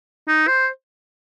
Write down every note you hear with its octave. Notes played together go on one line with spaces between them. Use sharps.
D#4
C5